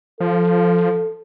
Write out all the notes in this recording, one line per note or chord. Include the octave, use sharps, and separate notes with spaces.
F3 A4